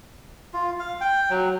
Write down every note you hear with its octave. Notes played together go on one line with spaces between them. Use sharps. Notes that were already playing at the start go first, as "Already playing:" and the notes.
F4
F5
G5
F#3